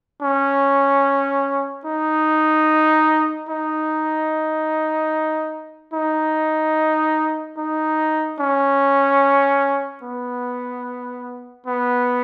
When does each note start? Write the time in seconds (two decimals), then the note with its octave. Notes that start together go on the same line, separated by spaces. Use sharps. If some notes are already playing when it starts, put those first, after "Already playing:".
0.22 C#4
1.85 D#4
3.49 D#4
5.93 D#4
7.57 D#4
8.40 C#4
10.03 B3
11.66 B3